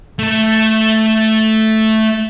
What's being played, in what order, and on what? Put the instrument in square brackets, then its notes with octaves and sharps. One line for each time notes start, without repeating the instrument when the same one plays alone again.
[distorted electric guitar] A3 A4